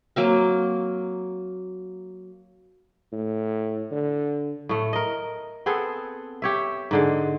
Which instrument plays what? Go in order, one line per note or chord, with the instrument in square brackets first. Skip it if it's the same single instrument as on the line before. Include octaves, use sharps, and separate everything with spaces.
[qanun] F#3 A#3 C4
[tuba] A2
D3
[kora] A2 A3
A#4 D#5
B3 C4 G#4 A4
G4 C#5 E5
G#2 D3 G#3